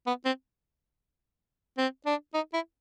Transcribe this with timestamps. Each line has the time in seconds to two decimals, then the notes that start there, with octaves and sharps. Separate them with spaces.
0.07 B3
0.25 C4
1.78 C4
2.06 D4
2.34 D#4
2.54 E4